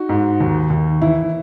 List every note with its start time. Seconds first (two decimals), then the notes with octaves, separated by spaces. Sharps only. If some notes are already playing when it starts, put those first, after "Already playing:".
Already playing: D#4 F#4
0.09 G#2
0.40 D#2
0.70 D#2
1.02 E3 E4